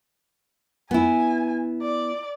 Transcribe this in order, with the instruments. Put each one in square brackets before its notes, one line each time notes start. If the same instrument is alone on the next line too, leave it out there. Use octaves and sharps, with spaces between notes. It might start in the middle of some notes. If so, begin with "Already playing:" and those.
[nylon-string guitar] B3 E4 [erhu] G#5
[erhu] D5